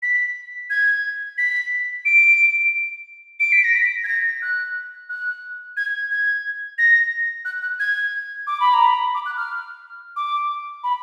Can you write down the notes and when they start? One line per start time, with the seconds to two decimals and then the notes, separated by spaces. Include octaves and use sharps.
0.02 B6
0.70 G#6
1.38 B6
2.05 D7
3.40 D7
3.52 B6
3.64 A#6
3.76 B6
4.04 G#6
4.08 A#6
4.42 F#6
5.09 F#6
5.77 G#6
6.11 G#6
6.78 A#6
7.45 F#6
7.62 F#6
7.80 G#6
8.47 D6
8.60 B5
8.74 A#5
8.87 B5
9.14 D6
9.26 F#6
9.37 F6
10.16 D6
10.83 B5